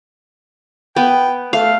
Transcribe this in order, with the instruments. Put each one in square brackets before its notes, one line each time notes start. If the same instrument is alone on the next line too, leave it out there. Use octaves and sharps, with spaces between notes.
[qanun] B3 [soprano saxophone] G5
[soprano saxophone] A3 [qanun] F5